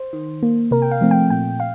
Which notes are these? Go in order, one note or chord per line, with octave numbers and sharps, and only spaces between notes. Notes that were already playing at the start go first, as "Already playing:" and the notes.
Already playing: C5
D#3
A#3
C3 A#4
G5
F5
F3 A3 C4
G5
A#2 G5
F5